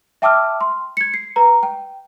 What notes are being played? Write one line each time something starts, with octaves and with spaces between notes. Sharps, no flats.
E5 G5 A5 D6 E6 F6
C6
G#6 C#7
C7
B4 A#5
G5